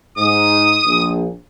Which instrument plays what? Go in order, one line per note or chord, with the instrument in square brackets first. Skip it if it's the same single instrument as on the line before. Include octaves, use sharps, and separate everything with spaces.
[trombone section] G#2 [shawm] D#6
[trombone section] A#1